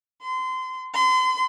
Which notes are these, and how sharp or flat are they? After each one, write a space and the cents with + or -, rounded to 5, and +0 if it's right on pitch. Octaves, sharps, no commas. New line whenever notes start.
C6 -30
C6 -35